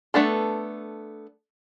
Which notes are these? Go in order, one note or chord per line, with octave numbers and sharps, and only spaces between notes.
A3 B3 D4 A4